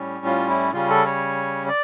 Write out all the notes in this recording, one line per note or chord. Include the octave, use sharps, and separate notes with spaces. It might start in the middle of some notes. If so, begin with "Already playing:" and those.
Already playing: A2 G3 C#4
F4
E4
C#3 G3 C#4 F4
A4
C#5
D5